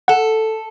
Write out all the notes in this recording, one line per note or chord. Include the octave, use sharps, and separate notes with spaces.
A4 F#5